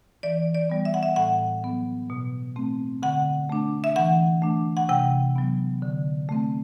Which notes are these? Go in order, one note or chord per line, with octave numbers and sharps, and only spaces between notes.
E3 D5
D5
G3 B3
E5
F#5
E5
A2 F#5
F#3 B3
B2
A3 C4
D3 F#5
A3 D4
E5
E3 F#5
A3 D4
F#5
C3 G5
F#3 B3
D3
A3 C4